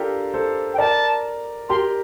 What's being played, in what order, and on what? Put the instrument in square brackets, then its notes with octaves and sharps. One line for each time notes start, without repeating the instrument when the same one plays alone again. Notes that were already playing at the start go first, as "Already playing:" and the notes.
Already playing: [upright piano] D4 F4 G4 A4 A#4
A4 C5
[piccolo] G5
[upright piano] A#4 D5 [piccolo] A5
[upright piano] G4 A#4 [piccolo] C6